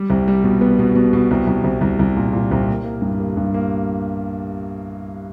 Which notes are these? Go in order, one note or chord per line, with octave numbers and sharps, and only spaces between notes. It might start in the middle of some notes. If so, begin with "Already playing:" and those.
Already playing: G3
C2
G3
B2
B3
B2
B2
B2
C2
C2
C2
C2
C2
A#2
A#2
C2
A#3
A#3
G2
A#3
G2
A#3